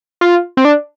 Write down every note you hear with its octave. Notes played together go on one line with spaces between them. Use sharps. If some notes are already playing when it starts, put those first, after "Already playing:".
F4
C4
D4